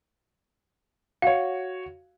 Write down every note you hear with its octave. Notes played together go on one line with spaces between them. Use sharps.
F#4 C#5 F5